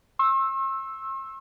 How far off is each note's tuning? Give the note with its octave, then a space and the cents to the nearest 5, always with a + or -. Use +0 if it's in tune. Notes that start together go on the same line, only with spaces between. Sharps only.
C6 +45 E6 +0